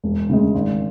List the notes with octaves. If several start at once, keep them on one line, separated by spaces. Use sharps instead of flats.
E1
D2 C#3 G#3
G#1